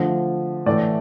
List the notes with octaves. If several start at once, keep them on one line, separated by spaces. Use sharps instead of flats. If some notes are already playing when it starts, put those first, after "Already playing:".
Already playing: D3 F3 A3
A2 E3 A3 D5